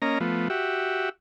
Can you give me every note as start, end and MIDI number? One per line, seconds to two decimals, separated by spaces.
0.02 0.19 58
0.02 0.19 61
0.02 0.19 75
0.02 0.19 82
0.20 0.48 53
0.20 0.48 57
0.20 0.48 59
0.50 1.09 66
0.50 1.09 67
0.50 1.09 76